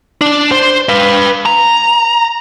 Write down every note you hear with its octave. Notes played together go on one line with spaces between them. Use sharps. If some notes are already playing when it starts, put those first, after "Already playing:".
D4
C5
B4 F5
A#5